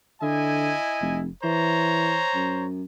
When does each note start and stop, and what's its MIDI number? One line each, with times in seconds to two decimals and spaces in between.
0.22 0.73 50
0.22 1.22 64
0.22 1.22 75
0.22 1.22 80
1.01 1.28 29
1.44 2.21 52
1.44 2.67 72
1.44 2.67 73
1.44 2.67 82
2.34 2.84 42